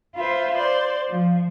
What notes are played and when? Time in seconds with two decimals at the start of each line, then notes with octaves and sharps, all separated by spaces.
0.15 F4 B4 C5 E5
0.57 C5 D5
1.07 F3